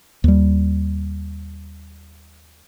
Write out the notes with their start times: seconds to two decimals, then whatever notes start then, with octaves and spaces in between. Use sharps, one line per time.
0.24 D#2 G3